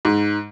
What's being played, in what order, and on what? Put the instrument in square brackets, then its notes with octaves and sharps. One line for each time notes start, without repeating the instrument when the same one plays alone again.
[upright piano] G#2